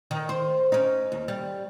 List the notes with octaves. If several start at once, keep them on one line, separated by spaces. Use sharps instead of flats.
D#3
C5
C#4 D#4
D#2
G3